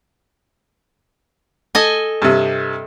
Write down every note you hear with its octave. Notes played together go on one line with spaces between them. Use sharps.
A4 D#5 G#5
G2 C3